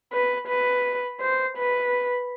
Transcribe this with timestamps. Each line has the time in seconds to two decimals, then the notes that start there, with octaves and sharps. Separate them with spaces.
0.13 B4
0.48 B4
1.21 C5
1.58 B4